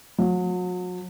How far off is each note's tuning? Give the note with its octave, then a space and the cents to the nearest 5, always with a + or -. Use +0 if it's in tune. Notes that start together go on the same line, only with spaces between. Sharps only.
F#3 -40